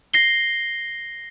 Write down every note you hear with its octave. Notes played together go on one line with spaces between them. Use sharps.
A#6 C7 G7